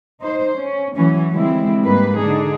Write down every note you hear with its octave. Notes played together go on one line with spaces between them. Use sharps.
D#4 C5
C#4
E3 F#3 A3 C#4
D3 F3 G3 G#3 C4 E4
G#2 G3 G#3 A#3 B4
D3 D4 D#4 G#4